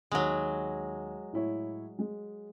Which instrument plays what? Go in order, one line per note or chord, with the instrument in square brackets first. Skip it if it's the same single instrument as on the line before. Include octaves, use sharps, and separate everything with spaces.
[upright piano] D#2 [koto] F#3 G#3
[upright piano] A2 E4 C#5
G#3